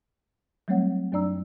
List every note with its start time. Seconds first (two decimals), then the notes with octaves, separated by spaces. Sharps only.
0.68 F#3 G3 A3 C4 C#5 F#5
1.12 F#2 F#3 D4 D5 A#5 E6